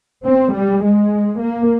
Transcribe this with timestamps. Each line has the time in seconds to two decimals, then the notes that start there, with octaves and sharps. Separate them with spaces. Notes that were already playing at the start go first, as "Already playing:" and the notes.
0.25 C4
0.54 G3
0.83 G#3
1.41 A#3